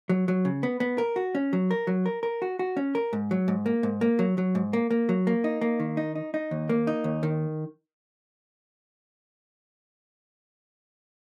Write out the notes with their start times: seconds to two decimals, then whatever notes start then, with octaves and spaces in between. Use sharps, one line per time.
0.09 F#3
0.28 F#3
0.45 C#3
0.63 B3
0.80 B3
0.98 A#4
1.16 F#4
1.35 C#4
1.53 F#3
1.71 A#4
1.87 F#3
2.06 A#4
2.23 A#4
2.42 F#4
2.59 F#4
2.77 C#4
2.95 A#4
3.13 G#2
3.31 F#3
3.48 G#2
3.66 A#3
3.83 G#2
4.01 A#3
4.19 F#3
4.38 F#3
4.55 G#2
4.73 A#3
4.90 A#3
5.09 F#3
5.27 A#3
5.44 D#4
5.61 A#3
5.80 D#3
5.97 D#4
6.15 D#4
6.34 D#4
6.51 D#2
6.69 A#3
6.87 D#4
7.04 D#2
7.23 D#3